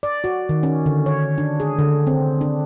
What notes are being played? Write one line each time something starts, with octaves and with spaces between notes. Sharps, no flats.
D5
F#4
D#3
C#4
D3
C#5
D4
G#4
D3
C4
D4